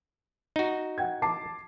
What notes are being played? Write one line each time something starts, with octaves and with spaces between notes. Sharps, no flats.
D#4 F#4
F#5 G5 G#6
A5 D6 C7